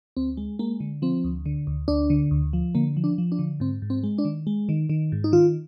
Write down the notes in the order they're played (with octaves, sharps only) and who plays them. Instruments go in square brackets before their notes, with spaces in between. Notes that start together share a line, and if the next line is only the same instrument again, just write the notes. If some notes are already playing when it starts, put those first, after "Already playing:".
[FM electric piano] D2 C4
G#3
G#3 A#3
D3
F3 C4
D2
D3
D2
D2 D4
D3
D2
F3
D3 A#3
F3
D4
F3
D4
D3
G#2 C4
G#2
C4
G#3
D4
D#3
G#3
D#3
D#3
G#2
D#4
D#3 F4